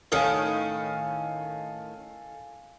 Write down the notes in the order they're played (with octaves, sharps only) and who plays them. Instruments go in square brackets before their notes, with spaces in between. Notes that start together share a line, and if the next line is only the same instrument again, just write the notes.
[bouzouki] A2 D#3 C#4 [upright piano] A4 F5 G#5